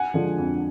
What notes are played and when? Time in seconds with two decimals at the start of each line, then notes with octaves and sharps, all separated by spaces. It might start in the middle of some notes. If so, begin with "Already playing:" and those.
Already playing: F#5 G#5
0.14 D3 F3 G#3
0.38 F2